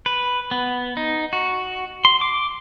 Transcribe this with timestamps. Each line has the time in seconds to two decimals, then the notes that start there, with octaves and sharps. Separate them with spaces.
0.06 B4
0.51 B3
0.97 D#4
1.33 F#4
2.05 C6
2.21 D6